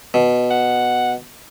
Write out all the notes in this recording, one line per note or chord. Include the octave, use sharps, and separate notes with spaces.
B2
F#5